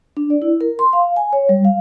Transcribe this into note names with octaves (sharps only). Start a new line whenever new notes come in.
D4
D5
E4
A#4
C6
F5
G#5
C#5
G3
F5